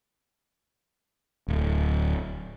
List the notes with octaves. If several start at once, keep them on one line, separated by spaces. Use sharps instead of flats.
D1